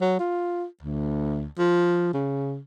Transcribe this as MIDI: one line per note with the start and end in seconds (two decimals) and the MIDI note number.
0.01 0.18 54
0.19 0.65 65
0.83 1.46 38
1.59 2.11 53
2.14 2.59 49